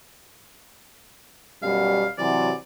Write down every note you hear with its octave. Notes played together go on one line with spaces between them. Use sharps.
F#2 B2 G3 F5
C3 E3 F#3 D5